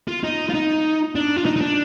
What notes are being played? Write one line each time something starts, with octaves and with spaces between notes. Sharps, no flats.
F4
D#4
F4
D#4
D4
F4
D#4
D#4
D4